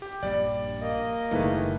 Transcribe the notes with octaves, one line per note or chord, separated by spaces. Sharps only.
G4
A#1 G2 G3 D5
A#3 D#5
F#1 D#3 E3 G3 A3 G#4 B4